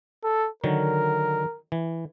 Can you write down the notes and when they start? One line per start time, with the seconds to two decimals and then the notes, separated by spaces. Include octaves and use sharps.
0.24 A4
0.64 D3 D#3 F#3 A#4
1.72 E3